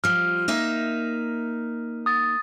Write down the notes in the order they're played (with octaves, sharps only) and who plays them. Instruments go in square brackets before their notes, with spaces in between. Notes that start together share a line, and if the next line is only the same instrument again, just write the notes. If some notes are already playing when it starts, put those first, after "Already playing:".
[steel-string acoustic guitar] F3 G3 [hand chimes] F6
[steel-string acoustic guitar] A#3 D#4 E5
[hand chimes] D#6 A6